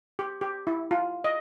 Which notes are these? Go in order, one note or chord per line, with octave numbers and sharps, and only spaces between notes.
G4
G4
E4
F4
D#5